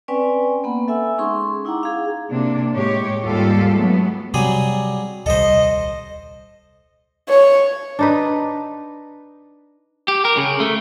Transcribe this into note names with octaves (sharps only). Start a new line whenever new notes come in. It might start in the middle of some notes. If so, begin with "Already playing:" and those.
C4 C#4 B4 D5 G5 G#5
A#3 B3 F#5 B5
A4 E5 F#5 G#5 E6
G#3 C#4 D#4 G#4 C6 C#6
D#4 E4 F#5 G5 A#5 D6
G#4 F5
C3 A#3 D4
A2 G#3 G4 C#5
D#2 G#2 G3 F4 G4 A4
F#3 G#3 A3 B3
C3 F#3 G3 G#4
D#1 C2 G3 A4 C5 D#5
C#5
D4 D#4 B4
G4
A#4
C#3
A3